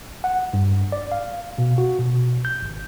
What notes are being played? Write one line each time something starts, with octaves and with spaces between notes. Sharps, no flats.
F#5
G2
D5
F5
B2
F#4
B2
G6
G#1